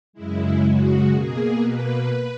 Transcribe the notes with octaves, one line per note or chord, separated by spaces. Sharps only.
F#2 C#3 G#3 E4
F#4
B2 A#3 G#4
B4